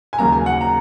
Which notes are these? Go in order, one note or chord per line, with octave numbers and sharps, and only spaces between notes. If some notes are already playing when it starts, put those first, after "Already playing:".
G#5
D#2 C#3 F#3 A#3 A#5
G#5
F#5
A#5